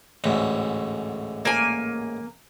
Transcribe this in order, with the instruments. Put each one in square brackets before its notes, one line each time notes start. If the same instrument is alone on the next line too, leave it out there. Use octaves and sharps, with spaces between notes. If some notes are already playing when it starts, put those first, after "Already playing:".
[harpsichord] A1 D2 G#2
[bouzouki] A#3 G#5